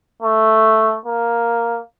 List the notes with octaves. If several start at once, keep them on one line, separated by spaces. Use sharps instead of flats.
A3
A#3